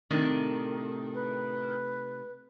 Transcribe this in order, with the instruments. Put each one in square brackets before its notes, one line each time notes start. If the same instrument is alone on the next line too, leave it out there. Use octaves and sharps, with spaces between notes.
[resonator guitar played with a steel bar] A2 D#3 D4 [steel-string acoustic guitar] C3 A3 D#4
[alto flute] B4